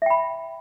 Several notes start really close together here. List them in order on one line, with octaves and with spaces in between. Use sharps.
E5 G5 B5